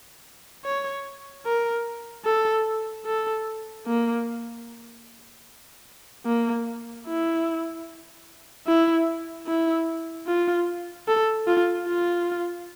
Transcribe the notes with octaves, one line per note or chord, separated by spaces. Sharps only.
C#5
A#4
A4
A4
A#3
A#3
E4
E4
E4
F4
A4
F4
F4